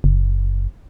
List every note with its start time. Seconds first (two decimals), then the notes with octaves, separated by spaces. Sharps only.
0.04 F#1